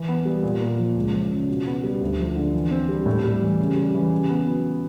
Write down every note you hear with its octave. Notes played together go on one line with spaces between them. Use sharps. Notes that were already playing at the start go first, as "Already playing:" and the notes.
Already playing: E3
B3
G3
A#2
A#3
F3
C#2
F3
C#3
B2
B3
G3
D2
F3
D3
E3
C4
G3
A2
G3
E3
C#3
G3
E3
C#3
B3
F#3